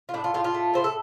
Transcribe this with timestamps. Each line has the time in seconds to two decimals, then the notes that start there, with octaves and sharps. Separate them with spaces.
0.09 F4
0.14 A2 D4
0.24 F4
0.34 A2 F4
0.44 F4
0.54 A3
0.74 A2 C5
0.84 A4